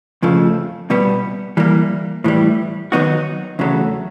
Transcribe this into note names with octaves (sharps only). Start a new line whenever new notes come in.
F2 C#3 F3 A3
C2 B2 G3 B3
E3 G3 A#3
A2 E3 G3
D#3 F#3 B3 D#4 F#4
E2 C#3 F#3 A3